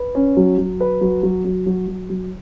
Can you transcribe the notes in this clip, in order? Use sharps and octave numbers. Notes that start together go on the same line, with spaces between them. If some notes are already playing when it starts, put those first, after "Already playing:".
Already playing: B4
C#4
F#3
F#3
B4
F#3
F#3
F#3
F#3
F#3
F#3